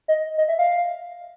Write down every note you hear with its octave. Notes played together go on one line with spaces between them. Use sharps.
D#5
D#5
E5
F5